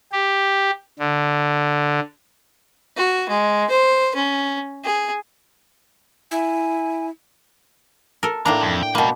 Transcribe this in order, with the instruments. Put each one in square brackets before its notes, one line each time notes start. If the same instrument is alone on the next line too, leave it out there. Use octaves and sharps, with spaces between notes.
[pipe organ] G4
D3
[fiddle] F#4
G#3
C5
C#4
G#4
[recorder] E4 [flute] G#5
[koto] A4 A#4
[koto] A2 A#3 D4 [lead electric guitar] C4 A#5
[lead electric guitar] F2
G5
[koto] B2 A#3 [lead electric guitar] B4 G5